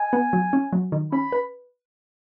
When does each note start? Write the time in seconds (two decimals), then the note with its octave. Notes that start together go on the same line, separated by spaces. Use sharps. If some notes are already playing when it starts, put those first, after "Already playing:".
Already playing: D#5 G#5
0.13 B3
0.33 F#3
0.53 C#4
0.73 F#3
0.92 D#3
1.12 C#4 B5
1.32 B4